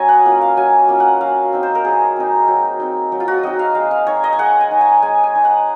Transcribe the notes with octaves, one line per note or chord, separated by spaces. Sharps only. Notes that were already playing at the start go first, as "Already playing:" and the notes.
Already playing: F#3 C#4 C#5 D#5 G#5 A#5
F#5
A#3 C#4 F4
F5
F#3 G#5
A#3 C#4 F4
F#5
F#3 F5
C4 D#4
C5
A#4
F#3 G#4
C4 D#4
F#3
C4 D#4
F#3
F4
F#4
C4 D#4 D#5
F5
G#3 F5
F5
D#4 C#5
D#5
G#5
G#3 F#5
G#5
D#4
G#5
G#3 G#5
G#5
D#4
F#5